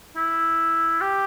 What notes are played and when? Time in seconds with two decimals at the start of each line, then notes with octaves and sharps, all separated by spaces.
0.17 E4
1.01 G4